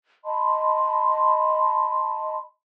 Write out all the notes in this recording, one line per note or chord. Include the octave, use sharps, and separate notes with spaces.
D#5 A5 B5 C6